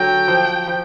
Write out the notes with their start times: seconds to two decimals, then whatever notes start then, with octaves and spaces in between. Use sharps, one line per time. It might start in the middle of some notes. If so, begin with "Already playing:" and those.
Already playing: D3 F#3 G5
0.28 F3
0.68 F3